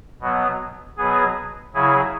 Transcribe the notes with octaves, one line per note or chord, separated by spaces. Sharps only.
B2 F#3 B3
B2 F#3 B3 G#4
C#3 F#3 E4 G#4